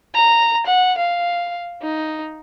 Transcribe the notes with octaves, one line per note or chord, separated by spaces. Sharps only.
A#5
F#5
F5
D#4